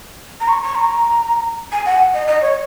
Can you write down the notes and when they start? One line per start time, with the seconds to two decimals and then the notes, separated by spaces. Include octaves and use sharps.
0.40 A#5
0.48 C#6
0.63 C#6
0.75 A#5
1.72 G#5
1.86 F#5
2.14 D#5
2.27 D#5
2.42 C#5